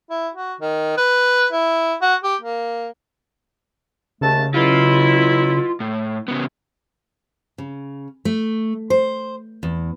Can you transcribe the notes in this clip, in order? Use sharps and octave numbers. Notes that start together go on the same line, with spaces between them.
E4
F#4
D#3
B4
E4
F#4
G4
A#3
D#2 C#3 A3 A5
B2 F#3 E4 F4
A2
C#3 B3
C#3
A3
C5
E2